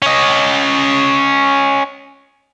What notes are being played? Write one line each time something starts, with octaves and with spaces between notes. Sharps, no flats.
C#4 D#5